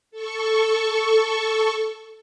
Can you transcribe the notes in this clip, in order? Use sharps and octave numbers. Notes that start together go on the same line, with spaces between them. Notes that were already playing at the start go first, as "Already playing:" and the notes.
A4 C#6